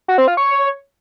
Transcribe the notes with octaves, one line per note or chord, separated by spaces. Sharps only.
F#4
C4
F4
C#5